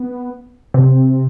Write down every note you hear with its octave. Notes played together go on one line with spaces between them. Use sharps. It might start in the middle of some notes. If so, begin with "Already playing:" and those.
Already playing: B3
C3 C4